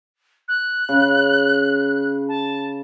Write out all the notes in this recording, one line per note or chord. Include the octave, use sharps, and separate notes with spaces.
F#6
C#3
A5